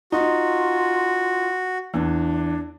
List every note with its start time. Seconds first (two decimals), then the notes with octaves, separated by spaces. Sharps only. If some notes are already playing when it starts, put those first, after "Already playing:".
0.12 D#4 F4 F#4
1.94 E2 D4